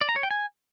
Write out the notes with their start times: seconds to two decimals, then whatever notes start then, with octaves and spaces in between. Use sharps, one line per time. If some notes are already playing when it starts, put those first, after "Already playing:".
0.01 D5
0.09 A#5
0.16 C#5
0.23 G5
0.31 G#5